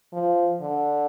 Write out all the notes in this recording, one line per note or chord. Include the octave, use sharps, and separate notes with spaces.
F3
D3